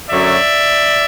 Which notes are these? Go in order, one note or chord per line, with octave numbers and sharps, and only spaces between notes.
F#2 D3 F#3 D5 E5